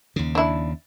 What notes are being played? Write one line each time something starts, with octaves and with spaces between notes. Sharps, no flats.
D#2 C#3
D4 E4